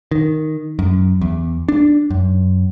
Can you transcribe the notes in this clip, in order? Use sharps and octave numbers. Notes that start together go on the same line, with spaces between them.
D#3
F#2
E2
D4
F#2